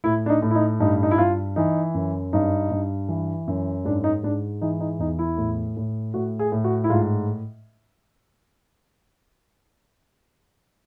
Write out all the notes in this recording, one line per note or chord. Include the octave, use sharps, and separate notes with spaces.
A2 E4
D4
D#4
A2
E4
D#4
G2 D#4
D#4
E4
G2 F4
E3 D#4
F#2
G2 D#4
G2
E3
F#2
G#2 D4
D#4
G#2 D4
E3 D#4
D#4
E2 D#4
E4
A2
A2
A2 F#4
G#4
A2
F#4
E4
G#2 F4